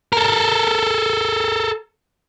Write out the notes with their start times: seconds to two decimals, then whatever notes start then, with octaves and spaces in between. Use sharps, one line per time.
0.13 A4 A#4